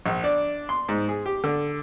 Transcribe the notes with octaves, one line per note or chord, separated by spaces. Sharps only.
A#1
D4
C6
G#2
G#4
G4
D3